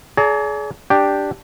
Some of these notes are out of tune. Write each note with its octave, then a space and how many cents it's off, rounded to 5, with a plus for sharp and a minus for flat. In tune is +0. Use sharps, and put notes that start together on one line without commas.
G#4 +30 D5 -40 A#5 -35
D4 +0 G4 +0 G5 +0